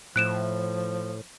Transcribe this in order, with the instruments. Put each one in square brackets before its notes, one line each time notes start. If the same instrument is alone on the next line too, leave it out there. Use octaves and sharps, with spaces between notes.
[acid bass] A2 [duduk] F3 [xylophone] F#6 D7 E7